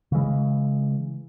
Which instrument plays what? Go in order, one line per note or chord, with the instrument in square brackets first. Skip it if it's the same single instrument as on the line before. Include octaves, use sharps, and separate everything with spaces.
[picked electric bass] C#3 E3 G#3